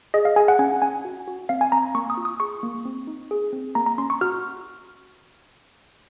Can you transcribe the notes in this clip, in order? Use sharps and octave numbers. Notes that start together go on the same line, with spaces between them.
G#4 D#5
F5
G#4 G#5
F#5
C#4 G#5
C#4 G#5
F#4
F#4
C4 F5
G#5
C4 A#5
A#3 C#6
D#6
F4
D#6
G#4 C#6
A#3
C4
D#4
G#4
C4
A#3 A#5
A#5
C#4 C6
C#6
F#4 F6